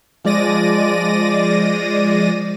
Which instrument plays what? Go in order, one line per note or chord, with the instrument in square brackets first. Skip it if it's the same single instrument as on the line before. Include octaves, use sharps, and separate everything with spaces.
[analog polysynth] F3 G#3 D5 A#6 D#7